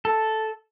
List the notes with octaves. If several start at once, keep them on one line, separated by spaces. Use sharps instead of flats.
A4